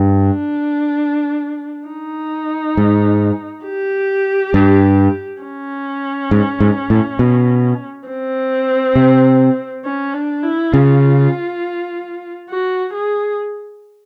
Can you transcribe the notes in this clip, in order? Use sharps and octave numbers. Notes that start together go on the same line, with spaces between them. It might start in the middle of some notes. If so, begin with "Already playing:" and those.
Already playing: G2
D4
D#4
G#2
G4
G2
C#4
G#2
G#2
A2
B2
C4
C3
C#4
D4
E4
C#3 F4
F#4
G#4